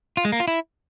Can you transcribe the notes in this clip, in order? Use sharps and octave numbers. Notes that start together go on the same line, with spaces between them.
F4
G#3
A#3
F4
E4